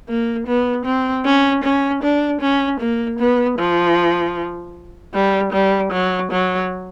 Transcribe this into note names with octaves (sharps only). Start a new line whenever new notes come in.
A#3
B3
C4
C#4
C#4
D4
C#4
A#3
B3
F3
G3
G3
F#3
F#3